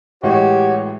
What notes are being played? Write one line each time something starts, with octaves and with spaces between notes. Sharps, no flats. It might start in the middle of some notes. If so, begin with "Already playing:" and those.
A2 E3 G#3 F#4 G4 C#5